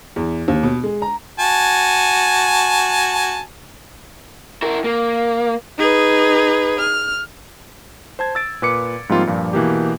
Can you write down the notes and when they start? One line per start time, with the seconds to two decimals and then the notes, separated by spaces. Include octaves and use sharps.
0.16 E2
0.48 D#2
0.63 B2
0.84 G#3
1.02 A#5
1.39 F#4 G#5 A5
4.62 E4 A#4
4.84 A#3
5.79 D#4 G#4 B4
6.79 F6
8.19 C5 A5 G#6
8.35 E6 A6 D7
8.62 A#2 B4 D6 C#7
9.09 G#2 F3 G3 A#3 C4 F4
9.27 G2 A#2 F3
9.53 B2 E3 A#3 G4